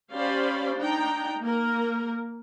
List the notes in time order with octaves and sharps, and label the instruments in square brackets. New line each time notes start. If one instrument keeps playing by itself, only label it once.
[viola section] C#4 G4 C5 D5 F5 B5
D4 D#4 G5 A#5
A#3 A#4